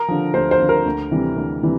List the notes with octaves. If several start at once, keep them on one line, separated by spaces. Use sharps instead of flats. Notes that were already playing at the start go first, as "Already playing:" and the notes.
Already playing: A#4
D3 F3
D2 C5
C5
D3 F3
A#4
D2
C3 E3 G3
D2
C3 E3 G3